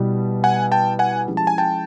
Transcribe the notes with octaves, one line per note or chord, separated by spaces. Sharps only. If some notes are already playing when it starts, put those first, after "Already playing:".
Already playing: B2 G3 B3 E4
F#5 G#5
G5 A5
F#5 G#5
F3 G#3 C#4 E4 G4
A5
G#5
G5 A5